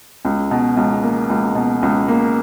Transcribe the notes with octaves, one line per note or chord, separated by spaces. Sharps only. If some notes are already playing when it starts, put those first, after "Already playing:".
C#2
B2
C#2
A#3
C#2
B2
C#2
A#3